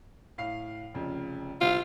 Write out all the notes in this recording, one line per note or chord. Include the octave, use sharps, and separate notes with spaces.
A2 F5 C7
F1 F2 C#3
C2 C4 F4